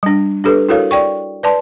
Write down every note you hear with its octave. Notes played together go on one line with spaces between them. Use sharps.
G3 D4
D4 G4 A4 B4
E4 F#4 A4 A#4 C#5 F5
D5 G5 C#6
B4 D5 A5 C6